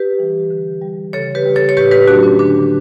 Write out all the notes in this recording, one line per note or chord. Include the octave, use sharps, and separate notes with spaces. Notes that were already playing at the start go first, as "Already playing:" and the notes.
Already playing: G4 B4
E3 G3
D3
G3
C#3 A4 C#5
G4 B4
G3
A4 C#5
C#5
A2 G4 B4
G4 B4
F#3 A3 D4 F#4
C#4
D3 D4